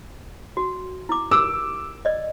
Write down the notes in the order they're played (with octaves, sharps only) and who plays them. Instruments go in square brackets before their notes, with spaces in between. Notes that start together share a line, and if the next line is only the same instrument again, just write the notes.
[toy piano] F#4
E4 D6
[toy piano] G4 A#4 [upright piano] D6 E6
[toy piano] D5 D#5